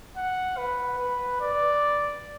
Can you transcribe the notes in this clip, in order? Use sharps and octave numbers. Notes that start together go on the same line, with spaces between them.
F#5
B4
B4
D5